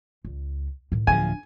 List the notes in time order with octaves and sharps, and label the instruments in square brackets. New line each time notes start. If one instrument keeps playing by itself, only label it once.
[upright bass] C#2
A2 D#3
[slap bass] D1 F3 [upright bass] D4 [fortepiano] G#5